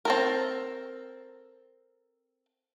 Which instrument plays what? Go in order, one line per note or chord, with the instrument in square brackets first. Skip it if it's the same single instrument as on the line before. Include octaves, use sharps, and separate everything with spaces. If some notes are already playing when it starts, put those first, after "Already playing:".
[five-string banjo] C4 A4 A#4